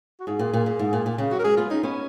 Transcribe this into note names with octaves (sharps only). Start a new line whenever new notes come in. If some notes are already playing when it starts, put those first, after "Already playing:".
F#4
G#2 G#4
A#2
A#2
A#2
G#2
A#2
A#2
C#3
F#3 F#4
A#4
G#3 G#4
B3 F4
C#4 D#4
B3 C#4